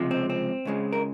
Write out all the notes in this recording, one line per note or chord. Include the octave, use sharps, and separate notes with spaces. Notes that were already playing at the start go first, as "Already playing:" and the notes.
Already playing: C#2 C3 F3 G#3
C4
C4
C#2 C#3 G#3
A#4